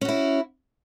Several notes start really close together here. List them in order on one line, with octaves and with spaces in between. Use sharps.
C#4 F#4 E4